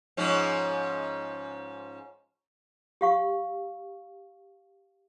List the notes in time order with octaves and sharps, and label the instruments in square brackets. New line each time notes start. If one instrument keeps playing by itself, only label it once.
[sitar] G#2 F3 C#4
[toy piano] G4 F5 C#6